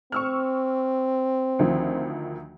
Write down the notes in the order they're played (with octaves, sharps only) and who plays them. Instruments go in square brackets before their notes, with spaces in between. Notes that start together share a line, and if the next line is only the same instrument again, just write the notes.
[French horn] C4 [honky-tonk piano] C#6 E6 F6
[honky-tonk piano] D2 D#3 F3